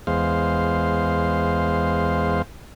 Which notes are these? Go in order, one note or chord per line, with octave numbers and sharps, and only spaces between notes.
E2 G#3 C5 F5